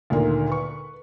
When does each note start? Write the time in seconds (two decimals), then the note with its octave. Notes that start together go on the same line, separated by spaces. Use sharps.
0.10 D2 A#2 D#3 A#3
0.49 B4 C#6